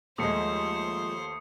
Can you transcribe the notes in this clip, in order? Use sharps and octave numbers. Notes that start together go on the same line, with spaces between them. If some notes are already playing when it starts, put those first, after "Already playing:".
D#2 F3 G#3 A3 C5 D#6 C#7